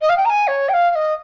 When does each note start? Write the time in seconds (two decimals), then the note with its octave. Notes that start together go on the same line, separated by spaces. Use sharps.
0.02 D#5
0.09 F5
0.17 G5
0.25 A#5
0.30 G#5
0.48 C#5
0.69 G5
0.74 F5
0.91 F5
0.95 D#5